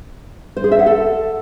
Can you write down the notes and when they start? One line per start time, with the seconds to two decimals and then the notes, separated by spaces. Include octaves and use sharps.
0.57 C5
0.64 G#4
0.71 E5
0.79 F#5
0.86 A4